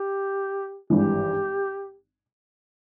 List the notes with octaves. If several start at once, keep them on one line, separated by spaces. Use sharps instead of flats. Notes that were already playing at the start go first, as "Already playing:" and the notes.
Already playing: G4
G#1 G2 E3 G4